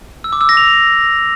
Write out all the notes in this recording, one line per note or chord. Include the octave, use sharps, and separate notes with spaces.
E6
D6
E6
A#6
F7